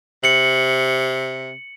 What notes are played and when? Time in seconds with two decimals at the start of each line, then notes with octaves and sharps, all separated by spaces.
0.24 C3 C#7 F#7